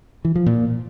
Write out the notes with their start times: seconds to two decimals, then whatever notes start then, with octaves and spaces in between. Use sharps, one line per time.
0.25 E3
0.35 F3
0.46 A#2